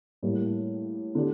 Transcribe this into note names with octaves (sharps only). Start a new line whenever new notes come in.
A2 G3 A#3
D3 A3 D4 G4